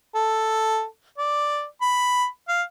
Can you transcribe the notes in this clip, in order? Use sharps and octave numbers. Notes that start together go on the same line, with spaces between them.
A4
D5
B5
F5